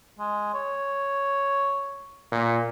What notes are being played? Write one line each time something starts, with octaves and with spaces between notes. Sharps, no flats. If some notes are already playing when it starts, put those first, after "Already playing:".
G#3
C#5
A#2